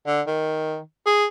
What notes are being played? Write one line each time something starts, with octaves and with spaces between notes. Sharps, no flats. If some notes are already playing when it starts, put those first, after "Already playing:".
D3
D#3
G#4